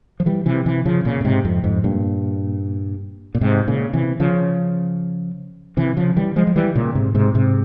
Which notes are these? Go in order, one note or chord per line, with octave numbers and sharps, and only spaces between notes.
F3
E3 G3
C3 E3
C3 E3
C#3 F3
A#2 C#3
A#2
G#2 C3
F2 G#2
F2 G#2
G2 A#2
A#2
G#2 C3
A#2 C#3
C3 E3
C#3 F3
C3 E3
C#3 F3
E3 G3
F3 G#3
F3
E3 G3
A#2 C#3
G#2 C3
G#2 C3
G#2 C3